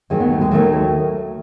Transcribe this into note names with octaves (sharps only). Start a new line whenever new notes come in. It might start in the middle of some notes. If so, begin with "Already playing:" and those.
D#2 D#3 F#3 G#4
B3
A3
G#3
D#2 D#3 F#3 A3